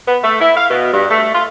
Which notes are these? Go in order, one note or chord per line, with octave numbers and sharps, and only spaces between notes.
B3
A3
E4
F5
B2
G2
A3
F4